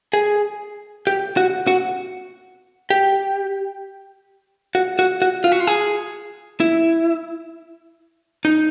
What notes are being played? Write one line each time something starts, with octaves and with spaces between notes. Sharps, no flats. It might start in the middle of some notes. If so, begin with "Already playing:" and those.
G#4
G4
F#4
F#4
G4
F#4
F#4
F#4
F4
F#4
F4
G#4
E4
D#4